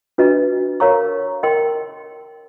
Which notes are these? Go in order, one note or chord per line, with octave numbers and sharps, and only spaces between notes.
D4 F#4 B4 D#5
A#4 C#5 F5 A#5 C#6
A#4 D#5 G5 C6